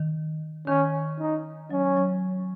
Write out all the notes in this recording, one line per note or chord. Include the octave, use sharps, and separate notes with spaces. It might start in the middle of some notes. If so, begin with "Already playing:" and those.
Already playing: D#3
D#3 C#4
D#4
F#3 C#4
F#3